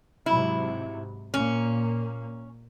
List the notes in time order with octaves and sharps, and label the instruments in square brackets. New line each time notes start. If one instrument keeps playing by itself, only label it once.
[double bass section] G#2 C3 F#3 [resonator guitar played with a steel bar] E4
[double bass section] A#2 A#3 [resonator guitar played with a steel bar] C#4